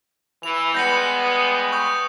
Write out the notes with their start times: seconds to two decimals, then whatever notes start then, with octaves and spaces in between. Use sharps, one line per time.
0.43 E3 F7
0.74 G3 G#3 B3 G6 A#6 C#7
1.23 D#6
1.72 C#6 D#6 G6